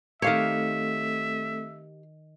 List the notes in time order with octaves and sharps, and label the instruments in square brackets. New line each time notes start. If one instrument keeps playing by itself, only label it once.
[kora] D#3 C#5 [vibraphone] A3 C4 A4 [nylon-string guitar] G4 F5 [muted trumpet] E5